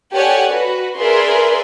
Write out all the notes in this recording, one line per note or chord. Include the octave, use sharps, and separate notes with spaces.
G4 A4 C#5 D5 F#5 G#5
F#4 B4
G#4 A#4 B4 D5 E5 C6